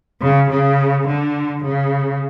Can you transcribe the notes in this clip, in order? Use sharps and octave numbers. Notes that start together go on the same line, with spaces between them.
C#3
C#3
D3
C#3